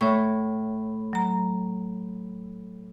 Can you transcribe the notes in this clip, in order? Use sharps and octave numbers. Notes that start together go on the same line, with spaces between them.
A2 C#5 E5 C#6
F#3 A#5